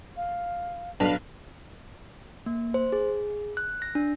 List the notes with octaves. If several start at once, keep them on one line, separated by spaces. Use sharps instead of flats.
F5
B1 D4 B4 F5 A5 F7
A#3
C5
G#4
F#6
A#6
D4